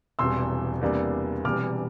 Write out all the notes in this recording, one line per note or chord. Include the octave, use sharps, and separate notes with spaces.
E1 E2 C3 G3 C6 E6
E2 C3 G3 A#3 D4
E1 E2 C3 G3 D6 F6